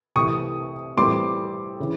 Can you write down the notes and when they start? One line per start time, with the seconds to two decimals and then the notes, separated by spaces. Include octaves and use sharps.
0.16 C2 C3 E3 A3 C#6 D#6
0.97 A2 E3 G3 C4 C6 D6
1.80 C#3 E3